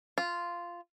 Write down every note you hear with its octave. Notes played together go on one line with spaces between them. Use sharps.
F4